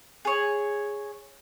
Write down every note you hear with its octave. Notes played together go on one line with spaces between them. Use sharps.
G#4 C#5